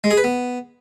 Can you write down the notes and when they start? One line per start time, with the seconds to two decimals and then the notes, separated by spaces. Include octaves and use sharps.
0.04 G#3
0.11 G#4
0.17 B4
0.24 B3